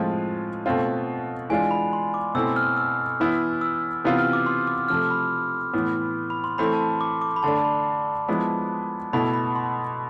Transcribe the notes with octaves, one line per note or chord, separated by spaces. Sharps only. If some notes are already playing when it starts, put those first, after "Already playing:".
Already playing: A2 F3 G#3 C4 F4
B2 A3 C4 F4
E3 G#3 D4 F4 G#5
B5
C6
D6
B2 A3 C4 E4 E6
F6
E6
E3 B3 E4
E6
C3 E3 B3 F4
F6
D6
C6
D6
C3 F3 A3 F6
B5
A2 E3 B3
B5
C6
E3 A3 C4 B5
A5
D6
D6
B5
D3 A3 D4 A5
B5
F3 G#3 B3 E4 B5
B2 A3 E4 B5
B5
C6